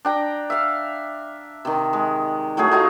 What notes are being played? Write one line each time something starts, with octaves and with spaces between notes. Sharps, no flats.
D4 G5 A#5
E5 F5
C3 D#3
G#3
A2 F#3 A3 G#4
F#3 D#4 F4 A#5